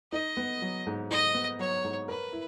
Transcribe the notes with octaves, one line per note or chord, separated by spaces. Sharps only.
D#4 D#5
B3
F#3
G#2
D#4 D#5
B3
F#3 C#5
G#2
A#4 B4
E4